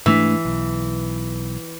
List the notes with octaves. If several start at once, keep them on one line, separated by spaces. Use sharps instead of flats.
G#2 E3 A3 D4
B1